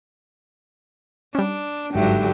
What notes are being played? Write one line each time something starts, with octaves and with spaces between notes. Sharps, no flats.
G3 C#4 D4
G#1 G2 D3 F#3 G4 E5